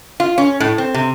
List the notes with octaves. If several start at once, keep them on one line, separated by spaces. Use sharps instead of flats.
F4
C#4
A2
C4
C3